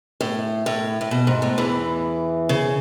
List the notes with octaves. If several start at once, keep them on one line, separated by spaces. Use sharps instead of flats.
A2
A2
A2
B2
G#2
A2
E2 E3
C#3